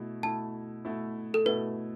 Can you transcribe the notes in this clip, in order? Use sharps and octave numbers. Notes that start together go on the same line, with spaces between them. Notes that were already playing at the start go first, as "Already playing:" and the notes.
Already playing: B2 A3 E4
B2 A3 E4 A5
B2 A3 E4
A4
B2 A3 E4 B4